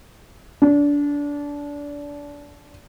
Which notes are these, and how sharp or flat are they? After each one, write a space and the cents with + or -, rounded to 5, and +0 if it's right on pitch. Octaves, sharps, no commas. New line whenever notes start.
D4 -25